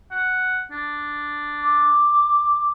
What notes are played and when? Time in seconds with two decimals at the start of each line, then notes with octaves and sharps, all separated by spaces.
0.11 F#5
0.71 D4
1.60 D6